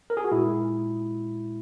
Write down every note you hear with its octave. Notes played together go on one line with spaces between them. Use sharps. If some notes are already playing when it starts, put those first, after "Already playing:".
A#4
G#4
F#4
A#2 G#3 E4